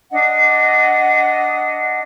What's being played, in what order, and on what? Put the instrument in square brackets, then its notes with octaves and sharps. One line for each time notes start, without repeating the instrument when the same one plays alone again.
[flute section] D4 D#5 F#5